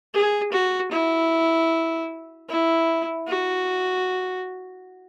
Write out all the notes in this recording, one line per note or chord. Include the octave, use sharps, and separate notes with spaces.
G#4
F#4
E4
E4
F#4